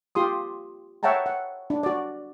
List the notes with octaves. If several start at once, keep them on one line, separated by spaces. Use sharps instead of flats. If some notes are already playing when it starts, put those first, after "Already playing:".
F4 G4 C6 D#6
C#5 E5 F#5 G5 A5 A#5
F#5
D4
F#4 D5